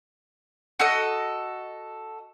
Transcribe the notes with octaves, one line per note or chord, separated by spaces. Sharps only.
F#4 A4 D#5